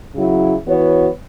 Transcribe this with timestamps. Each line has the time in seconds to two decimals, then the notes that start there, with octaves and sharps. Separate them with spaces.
0.15 C#3 F#3 E4
0.66 E3 B3 F#4 C#5